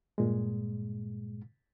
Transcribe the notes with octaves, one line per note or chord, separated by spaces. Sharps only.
G2 A#2 G#3